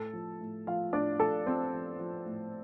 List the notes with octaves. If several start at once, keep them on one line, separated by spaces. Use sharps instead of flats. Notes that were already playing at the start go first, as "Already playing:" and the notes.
Already playing: A2 A4
F3
A2
F3 F4 F5
A2 D4 D5
F3 A4
F3 C4 C5
F3
F3
A2